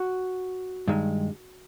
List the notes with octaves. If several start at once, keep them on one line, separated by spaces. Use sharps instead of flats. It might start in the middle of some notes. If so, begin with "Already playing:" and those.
Already playing: F#4
G2 D#3 G#3